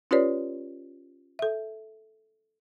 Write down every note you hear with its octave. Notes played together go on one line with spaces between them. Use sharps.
C#4 F4 G4 B4 C#5 D5
A4 E5